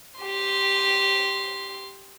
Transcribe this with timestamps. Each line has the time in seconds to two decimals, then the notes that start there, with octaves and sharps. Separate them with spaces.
0.20 G4 C6